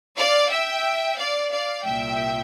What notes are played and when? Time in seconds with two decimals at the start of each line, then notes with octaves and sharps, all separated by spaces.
0.17 D5 F5
0.51 E5 G5
1.18 D5 F5
1.51 D5 F5
1.85 C2 A#2 E5 G5